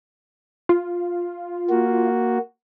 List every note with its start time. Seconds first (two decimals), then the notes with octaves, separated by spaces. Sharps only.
0.69 F4
1.70 A#3 F#4